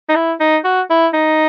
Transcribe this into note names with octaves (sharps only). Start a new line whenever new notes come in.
D#4
E4
D#4
F#4
E4
D#4